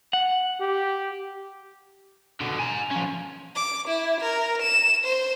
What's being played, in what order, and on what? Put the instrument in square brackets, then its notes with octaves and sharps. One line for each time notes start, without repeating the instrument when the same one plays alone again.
[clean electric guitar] F#5
[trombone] G4
[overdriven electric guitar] B2 D3
G#5 A#5
F3 C#4
[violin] D6
E4
A#4
E7
C5